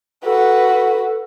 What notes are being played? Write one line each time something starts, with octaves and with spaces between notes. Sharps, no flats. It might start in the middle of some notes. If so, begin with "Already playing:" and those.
F#4 A4 B4